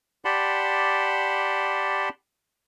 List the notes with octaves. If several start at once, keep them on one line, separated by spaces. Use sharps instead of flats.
G4 D5 F#5 A5 B5 C6